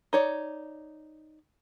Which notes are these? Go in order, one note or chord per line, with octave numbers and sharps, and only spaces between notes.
D#4 C#5 D5